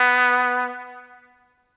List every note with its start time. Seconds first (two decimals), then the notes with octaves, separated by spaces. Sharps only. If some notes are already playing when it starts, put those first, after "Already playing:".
Already playing: B3